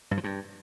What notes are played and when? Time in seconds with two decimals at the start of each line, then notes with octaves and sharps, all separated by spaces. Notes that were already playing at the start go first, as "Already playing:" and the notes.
0.11 G2
0.17 F3
0.24 G2